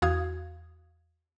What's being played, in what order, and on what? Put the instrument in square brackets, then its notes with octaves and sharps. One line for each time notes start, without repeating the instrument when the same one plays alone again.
[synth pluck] E2 F#4 F5 D#6 G#6